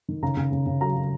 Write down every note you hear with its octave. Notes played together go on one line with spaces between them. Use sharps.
D#3
C#3 A#5
C#3
C#3
C#3
F#3 A#5
F#3